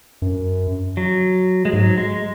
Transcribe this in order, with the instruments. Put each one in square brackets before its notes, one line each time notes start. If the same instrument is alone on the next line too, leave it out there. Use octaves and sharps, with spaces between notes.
[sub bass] F#2
[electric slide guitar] F#3
G#3
[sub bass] G#2 [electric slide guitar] F#3
[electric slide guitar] G#3